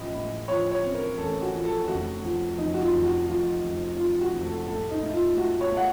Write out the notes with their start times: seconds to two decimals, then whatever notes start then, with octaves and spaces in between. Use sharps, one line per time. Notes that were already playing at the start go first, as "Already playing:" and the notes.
Already playing: A1 A2 F3 D#5
0.14 A2
0.48 F3 C#5
0.72 C#5
0.84 C4
0.95 A#4
1.18 A1 A4
1.42 F#4
1.54 F3
1.65 A4
1.88 F1 F#4
2.23 F3
2.57 F2 D#4
2.74 F#4
2.81 F4
2.92 F1
3.05 F#4
3.28 F2 F4
3.63 F1
3.97 F3 F4
4.21 F#4
4.33 F1
4.44 A4
4.67 A2 A4
4.91 D#4
5.02 A3 D#4
5.13 F4
5.36 A3 F#4
5.61 C#5
5.71 A3
5.77 F#5